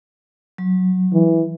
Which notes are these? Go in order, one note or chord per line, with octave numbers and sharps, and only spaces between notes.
F#3
E3